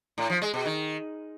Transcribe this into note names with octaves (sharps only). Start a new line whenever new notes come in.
A2
F3
G#3
B2
D#3